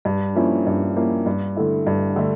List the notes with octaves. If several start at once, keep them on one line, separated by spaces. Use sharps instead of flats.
G2
F3 A#3 C#4 E4
G2
F3 A#3 C#4 E4
G2
D3 A3 E4
G2
D3 A3